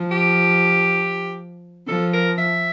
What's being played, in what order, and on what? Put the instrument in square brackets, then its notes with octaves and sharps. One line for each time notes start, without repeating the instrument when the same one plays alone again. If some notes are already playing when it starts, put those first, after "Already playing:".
Already playing: [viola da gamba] F3
[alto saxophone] G4
[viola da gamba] F3 [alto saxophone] A4
[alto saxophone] A#4
E5